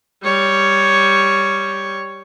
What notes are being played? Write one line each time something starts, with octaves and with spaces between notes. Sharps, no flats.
G3 C#5